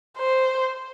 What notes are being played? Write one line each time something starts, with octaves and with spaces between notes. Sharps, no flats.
C5